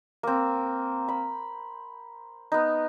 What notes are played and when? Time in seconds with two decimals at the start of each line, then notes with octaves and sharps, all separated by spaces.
0.23 A#3 C4
1.08 B5
2.52 B3 D#4